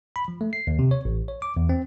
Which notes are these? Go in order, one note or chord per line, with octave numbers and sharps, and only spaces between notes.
B5
F3
A3
C7
D#2
C3
C#5
A1
C#5
D6
E2
C4